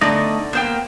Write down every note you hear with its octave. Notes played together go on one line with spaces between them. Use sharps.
D3 A3 B3 D#4 D5 D#5
A#3 B3 C5 G5